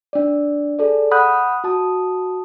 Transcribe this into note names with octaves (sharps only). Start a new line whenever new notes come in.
D4 D5
G#4 A4 D5
F#5 B5 D#6 F#6 G6
F#4 A5 D#6